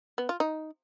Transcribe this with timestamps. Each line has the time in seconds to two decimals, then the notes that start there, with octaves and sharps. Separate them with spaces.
0.18 B3
0.29 F4
0.40 D#4